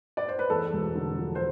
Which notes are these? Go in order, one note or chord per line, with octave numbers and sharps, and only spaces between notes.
D5
C5
B4
E2 A4
E1
D3
F3
C5